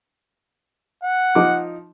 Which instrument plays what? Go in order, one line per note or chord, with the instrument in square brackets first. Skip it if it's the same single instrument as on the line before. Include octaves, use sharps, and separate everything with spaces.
[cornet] F#5
[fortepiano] F3 D#4 D6